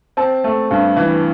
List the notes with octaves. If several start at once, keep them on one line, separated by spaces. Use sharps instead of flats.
C4 A5
A3
G2
E3